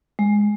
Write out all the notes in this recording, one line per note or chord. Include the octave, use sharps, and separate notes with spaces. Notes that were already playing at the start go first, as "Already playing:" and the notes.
G#3